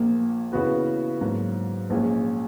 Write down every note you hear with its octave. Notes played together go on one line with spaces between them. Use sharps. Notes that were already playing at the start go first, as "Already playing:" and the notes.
Already playing: A#1 A#2 A#3
C#3 E3 B3 F#4 B4
G#2 F#3 A#3
A#1 A#2 G#3 C#4